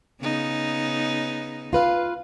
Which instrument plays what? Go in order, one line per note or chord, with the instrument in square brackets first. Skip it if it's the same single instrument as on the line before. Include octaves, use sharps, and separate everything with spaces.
[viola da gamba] C#3 B3 D#4
[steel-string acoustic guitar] F4 B4 F5